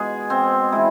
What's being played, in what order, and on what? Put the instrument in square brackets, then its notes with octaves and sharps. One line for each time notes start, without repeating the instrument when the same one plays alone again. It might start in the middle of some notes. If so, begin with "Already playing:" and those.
Already playing: [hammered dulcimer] B2 G#3 G#4
C4
E3 G#3 E4